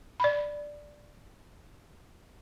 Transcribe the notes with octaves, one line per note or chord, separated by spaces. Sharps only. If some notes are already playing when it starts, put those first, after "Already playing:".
D5 B5